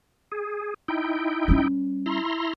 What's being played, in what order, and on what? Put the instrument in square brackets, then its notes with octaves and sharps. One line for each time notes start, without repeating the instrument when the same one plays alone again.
[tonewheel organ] G#4
D#4 E4 G5
[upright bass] G3 C#4
[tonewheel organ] E4 A#5 C6